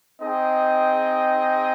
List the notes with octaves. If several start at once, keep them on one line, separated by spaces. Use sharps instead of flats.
C4 D#4 G#4 D#5 G5